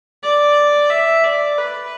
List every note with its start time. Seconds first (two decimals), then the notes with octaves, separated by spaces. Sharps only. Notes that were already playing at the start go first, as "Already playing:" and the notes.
0.24 D5
0.91 E5
1.24 D5
1.58 B4